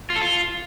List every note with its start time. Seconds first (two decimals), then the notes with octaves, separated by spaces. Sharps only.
0.10 F4
0.16 A4
0.22 F4